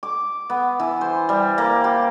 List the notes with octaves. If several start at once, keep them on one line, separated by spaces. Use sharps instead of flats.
D6
B3
E3
C5
G3
A#3
G4